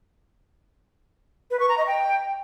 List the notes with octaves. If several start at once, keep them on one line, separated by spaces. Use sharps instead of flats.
B4
C#6
A#5
D#5
G5